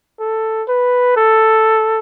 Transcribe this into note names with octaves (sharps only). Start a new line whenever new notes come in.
A4
B4
A4